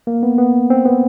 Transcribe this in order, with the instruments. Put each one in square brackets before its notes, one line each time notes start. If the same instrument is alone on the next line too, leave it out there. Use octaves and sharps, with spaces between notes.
[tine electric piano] A#3
B3
B3
C4
B3